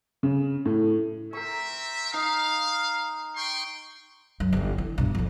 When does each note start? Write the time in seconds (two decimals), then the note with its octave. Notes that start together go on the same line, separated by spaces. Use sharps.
0.23 C#3
0.65 A2
1.33 C4 A#4 E5 C#6
2.14 D#4 F5
3.36 G5 C6 C#6
4.40 F#2
4.53 G1 E2
4.78 E3
4.98 G2 B2
5.15 F2 F3